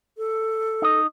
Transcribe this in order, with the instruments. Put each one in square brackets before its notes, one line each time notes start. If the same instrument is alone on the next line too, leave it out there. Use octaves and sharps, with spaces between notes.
[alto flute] A4
[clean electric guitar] D#4 D#5